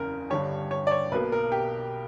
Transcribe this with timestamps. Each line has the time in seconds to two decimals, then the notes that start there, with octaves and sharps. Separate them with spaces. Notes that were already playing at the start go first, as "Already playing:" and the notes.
Already playing: F#1 E2 C#3 A#4
0.30 G1 G2 D3 G3 C#5
0.71 C#5
0.87 D5
0.91 C#5
1.12 B1 B2 A#3 B4
1.32 A#4
1.52 G4